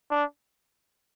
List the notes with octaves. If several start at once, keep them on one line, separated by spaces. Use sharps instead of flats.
D4